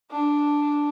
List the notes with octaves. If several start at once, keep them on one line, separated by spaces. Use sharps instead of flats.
D4